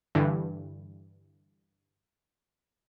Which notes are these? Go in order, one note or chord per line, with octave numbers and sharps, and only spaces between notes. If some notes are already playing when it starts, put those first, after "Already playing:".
G2 D3 E3